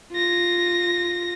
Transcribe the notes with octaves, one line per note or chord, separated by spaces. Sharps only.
F4 A#6